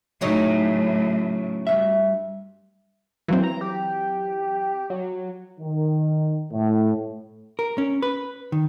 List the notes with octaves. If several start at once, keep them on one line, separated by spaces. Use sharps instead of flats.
A2 C#3 F#3 D#4
G2 B2 E5
E3 F#3 A#3 C4
A#5
G4
F#3
D#3
A2
A#4
C#4
B4
D#3